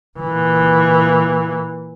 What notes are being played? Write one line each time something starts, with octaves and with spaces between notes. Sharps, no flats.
A#2 E3